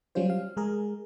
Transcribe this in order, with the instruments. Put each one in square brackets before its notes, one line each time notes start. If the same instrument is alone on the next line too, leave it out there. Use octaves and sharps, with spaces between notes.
[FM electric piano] F#3 G3 C#4 F4 C5
F5
G#3 G#4 A#4